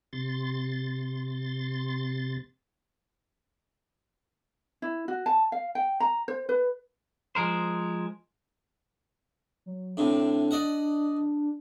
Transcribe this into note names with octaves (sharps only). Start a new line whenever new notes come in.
C3 C6 A6
E4
F#4
A5
F5
G5
A#5
C5
B4
F3 G#3 A#4 C5
F#3
A2 C3 D4
D5 D#5 F#5